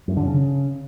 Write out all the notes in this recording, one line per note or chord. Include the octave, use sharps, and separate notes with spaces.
F#2
D3
C#3